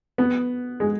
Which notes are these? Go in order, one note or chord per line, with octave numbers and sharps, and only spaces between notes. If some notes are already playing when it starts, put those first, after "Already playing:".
B3
G#3